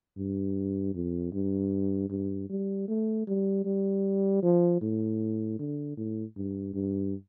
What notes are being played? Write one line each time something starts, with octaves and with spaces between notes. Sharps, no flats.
G2
F2
G2
G2
G3
A3
G3
G3
F3
A2
D3
A2
G2
G2